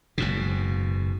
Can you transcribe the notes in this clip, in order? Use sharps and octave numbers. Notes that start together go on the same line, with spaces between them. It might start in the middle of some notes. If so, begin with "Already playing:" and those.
F#1 G#2 B2